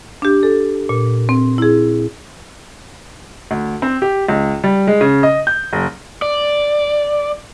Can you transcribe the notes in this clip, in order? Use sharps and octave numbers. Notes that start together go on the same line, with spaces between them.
D4 G4
A4
A#2
C4
E4 G#4
D2
C4
G4
C#2
G3
G#3
C#3
D#5
G6
F#1
D5